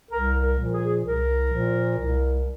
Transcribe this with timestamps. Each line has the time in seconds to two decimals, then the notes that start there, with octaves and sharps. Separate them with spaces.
0.11 C2 A#4
0.42 A#4
0.58 A#2 F3
0.73 G#4
1.04 C2 A#4
1.51 A#2 F3
1.97 C2